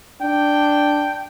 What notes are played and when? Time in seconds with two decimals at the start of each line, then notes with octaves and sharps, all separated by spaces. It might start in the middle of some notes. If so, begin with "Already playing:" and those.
0.22 D4 G5